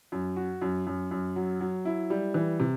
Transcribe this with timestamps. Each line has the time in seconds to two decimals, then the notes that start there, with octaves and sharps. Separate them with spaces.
0.12 F#2
0.37 F#4
0.62 F#2
0.87 F#2
1.11 F#2
1.36 F#3
1.61 F#3
1.85 E4
2.10 G3
2.34 E3
2.59 C3